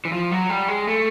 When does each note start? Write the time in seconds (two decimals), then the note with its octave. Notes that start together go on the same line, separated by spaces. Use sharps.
0.05 E3
0.12 F3
0.31 F#3
0.50 G3
0.68 G#3
0.87 A3